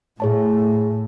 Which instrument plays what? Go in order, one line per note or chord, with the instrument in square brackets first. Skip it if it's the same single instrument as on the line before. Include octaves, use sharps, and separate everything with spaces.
[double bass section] A2 [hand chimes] G#4 C#5 A5